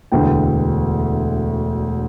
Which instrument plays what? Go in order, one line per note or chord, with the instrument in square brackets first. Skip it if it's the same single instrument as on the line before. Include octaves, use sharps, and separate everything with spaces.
[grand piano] E1 D2 D3 G5